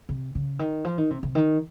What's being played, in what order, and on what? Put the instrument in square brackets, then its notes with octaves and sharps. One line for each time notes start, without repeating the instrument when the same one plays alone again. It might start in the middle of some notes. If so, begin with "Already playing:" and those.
[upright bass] C3
C#3
D#3
F3
D#3
C3
C3
D#3